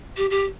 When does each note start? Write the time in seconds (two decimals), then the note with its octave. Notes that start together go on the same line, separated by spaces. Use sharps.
0.17 G4
0.30 G4